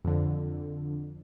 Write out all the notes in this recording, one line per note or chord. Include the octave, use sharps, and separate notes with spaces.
F2 D3